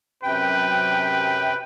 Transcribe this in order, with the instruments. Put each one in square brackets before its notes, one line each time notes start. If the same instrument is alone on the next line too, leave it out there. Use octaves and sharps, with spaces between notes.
[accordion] F#2 C3 G5 [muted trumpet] B4